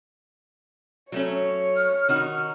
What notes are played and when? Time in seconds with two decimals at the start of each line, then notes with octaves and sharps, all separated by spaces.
1.12 F#3 A3 C#4 C#5
1.76 F6
2.09 D#3 D#4 F#4